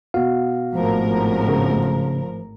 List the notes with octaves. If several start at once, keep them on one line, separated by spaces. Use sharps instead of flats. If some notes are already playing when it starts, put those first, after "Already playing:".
B2 F#4 F5
G#1 A2 F3 A#4
C#3